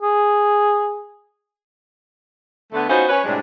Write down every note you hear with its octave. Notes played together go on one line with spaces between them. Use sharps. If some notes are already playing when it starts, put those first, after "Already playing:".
G#4
D3 A3 B3
B3 C#4 D#4 F4 F#4 C5
C#4 B4 C#5
A2 C3 G3 G#3 D4